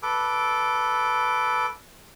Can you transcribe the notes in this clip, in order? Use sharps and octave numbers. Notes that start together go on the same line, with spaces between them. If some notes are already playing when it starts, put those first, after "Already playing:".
A4 B4 D6